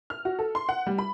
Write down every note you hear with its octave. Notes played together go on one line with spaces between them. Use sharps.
F6
F#4
A4
C6
F#5
G3
B5